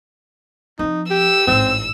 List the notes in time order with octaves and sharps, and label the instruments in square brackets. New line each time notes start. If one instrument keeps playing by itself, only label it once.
[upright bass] F3 C4 [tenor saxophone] D#4
[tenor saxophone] G4 [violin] E6
[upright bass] A1 G#2 [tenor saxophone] C4